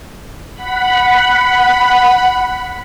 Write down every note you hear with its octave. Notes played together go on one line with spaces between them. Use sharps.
F#5 B5